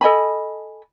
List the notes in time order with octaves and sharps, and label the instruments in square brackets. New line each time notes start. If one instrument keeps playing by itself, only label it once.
[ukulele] A4 D#5 G#5 B5